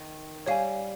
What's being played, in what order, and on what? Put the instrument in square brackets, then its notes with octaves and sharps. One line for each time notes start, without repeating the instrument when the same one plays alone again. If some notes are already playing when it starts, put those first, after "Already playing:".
Already playing: [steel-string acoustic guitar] D#3
[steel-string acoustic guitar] G3 [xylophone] C#5 F5 G#5